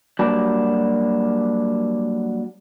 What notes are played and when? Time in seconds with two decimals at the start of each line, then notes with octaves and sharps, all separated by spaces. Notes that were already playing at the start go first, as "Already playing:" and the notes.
0.19 F#3 G3 A#3 D4 F#4